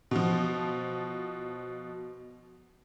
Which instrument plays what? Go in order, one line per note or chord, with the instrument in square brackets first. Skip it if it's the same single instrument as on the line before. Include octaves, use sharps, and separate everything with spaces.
[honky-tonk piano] B2 F3